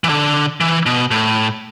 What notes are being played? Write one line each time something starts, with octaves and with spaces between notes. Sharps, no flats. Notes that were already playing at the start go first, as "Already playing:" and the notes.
E3
D3
E3
B2
A2